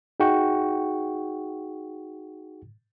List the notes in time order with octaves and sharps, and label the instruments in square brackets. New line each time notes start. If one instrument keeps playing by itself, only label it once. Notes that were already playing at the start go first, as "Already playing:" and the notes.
[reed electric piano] D#4 F#4 G#4 F#5 G5 C#6